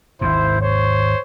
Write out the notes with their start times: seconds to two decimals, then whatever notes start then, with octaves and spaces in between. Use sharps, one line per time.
0.21 G#1 D#2 G#2 E4 C5
0.61 C5 C#5